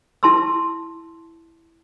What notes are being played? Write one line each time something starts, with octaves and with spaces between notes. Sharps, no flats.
E4 A5 C6 E6